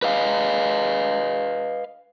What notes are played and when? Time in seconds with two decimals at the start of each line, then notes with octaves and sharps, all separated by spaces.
0.02 B4 D#5 F5